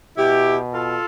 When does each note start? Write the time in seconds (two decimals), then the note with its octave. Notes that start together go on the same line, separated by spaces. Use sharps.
0.18 B2 E4 G4
0.73 F4 A4